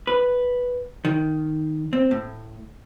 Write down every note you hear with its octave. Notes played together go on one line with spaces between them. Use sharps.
B4
D#3
C4
A2